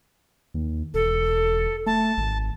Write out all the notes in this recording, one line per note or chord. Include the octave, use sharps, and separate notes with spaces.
D#2
E1 A4
A3 A5
G#1